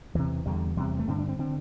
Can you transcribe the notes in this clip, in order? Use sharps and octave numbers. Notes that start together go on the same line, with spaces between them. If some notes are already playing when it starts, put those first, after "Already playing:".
E2 C3 E3
E2 D3 G3
E2 C3 G3
A3
G2 D3 C4
D4
C4
D3 C4